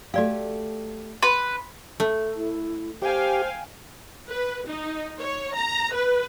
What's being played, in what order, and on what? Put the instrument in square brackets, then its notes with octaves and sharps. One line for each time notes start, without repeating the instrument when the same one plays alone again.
[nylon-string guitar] A3 G4 [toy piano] F#4 D5 F5
[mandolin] B4 [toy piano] C6
[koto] A3
[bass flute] E4
[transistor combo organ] G4 [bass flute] C5 [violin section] F5 G5 G#5
[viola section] B4
D#4
C#5
A#5
B4